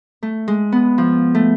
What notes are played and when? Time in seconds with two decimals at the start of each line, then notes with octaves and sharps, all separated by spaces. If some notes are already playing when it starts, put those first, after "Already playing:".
0.23 A3
0.48 G#3
0.72 B3
0.98 F3
1.35 A3